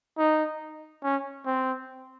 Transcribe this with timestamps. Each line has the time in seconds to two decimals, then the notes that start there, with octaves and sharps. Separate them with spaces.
0.18 D#4
1.03 C#4
1.46 C4